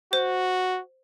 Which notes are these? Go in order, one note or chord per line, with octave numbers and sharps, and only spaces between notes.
F#4 C5